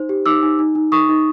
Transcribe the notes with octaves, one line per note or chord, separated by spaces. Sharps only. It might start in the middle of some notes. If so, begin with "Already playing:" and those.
Already playing: D#4 C5
G4
D#4 D6 E6
D#4
D#4
D#4
D#4 C#6 D#6
D#4